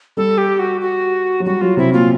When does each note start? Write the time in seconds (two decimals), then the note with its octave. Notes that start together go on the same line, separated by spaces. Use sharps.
0.17 G3 A4
0.38 G4
0.59 F#4
0.81 F#4
1.40 F#3
1.45 G3 F#4
1.61 F#3 F4
1.77 C3 E4
1.93 A#2 F4